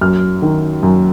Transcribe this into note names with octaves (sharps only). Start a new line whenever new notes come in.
F#2 F6
D#3
F#2